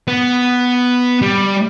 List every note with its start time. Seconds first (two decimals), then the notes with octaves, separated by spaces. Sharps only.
0.08 B3
1.22 G3